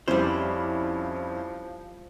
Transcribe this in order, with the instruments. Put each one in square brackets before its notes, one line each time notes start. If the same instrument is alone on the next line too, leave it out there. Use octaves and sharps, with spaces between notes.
[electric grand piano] F2 C#4 E4 [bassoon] F3 [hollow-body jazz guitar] G3 C5